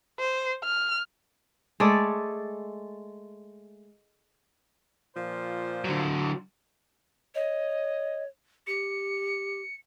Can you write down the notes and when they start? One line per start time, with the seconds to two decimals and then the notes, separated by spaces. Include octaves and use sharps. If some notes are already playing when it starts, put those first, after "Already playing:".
0.20 C5
0.64 F6
1.80 G#3 A3 A4 D5
5.15 A#2 F3 C5
5.85 D3 F#3
7.35 C#5 D#5
8.67 G4 C#7